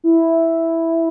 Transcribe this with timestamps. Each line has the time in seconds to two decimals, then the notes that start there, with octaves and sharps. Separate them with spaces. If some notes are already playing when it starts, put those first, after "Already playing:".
0.04 E4